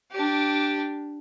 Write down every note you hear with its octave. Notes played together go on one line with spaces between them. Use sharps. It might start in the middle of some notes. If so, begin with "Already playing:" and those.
D4 G4